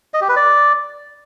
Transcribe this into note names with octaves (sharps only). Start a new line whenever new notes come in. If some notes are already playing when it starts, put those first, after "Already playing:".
D#5
G4
B4
D5